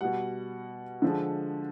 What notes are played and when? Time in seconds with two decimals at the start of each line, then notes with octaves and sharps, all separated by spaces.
0.01 B2 G3 F#5
1.02 D3 F3 G#3